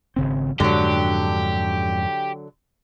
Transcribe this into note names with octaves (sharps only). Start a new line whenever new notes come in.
G#1 C#3 C4
F2 G#2 D3 F#3 G#3 G4